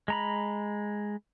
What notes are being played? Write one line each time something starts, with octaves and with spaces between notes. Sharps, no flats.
G#3 A#5 B5